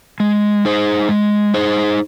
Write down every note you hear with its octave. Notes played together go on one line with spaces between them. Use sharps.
G#3
D#4 G#4 C5
G#3
D#4 G#4 C5